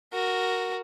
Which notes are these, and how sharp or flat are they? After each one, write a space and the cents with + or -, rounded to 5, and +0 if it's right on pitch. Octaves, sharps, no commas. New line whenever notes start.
F#4 +0 A#4 +0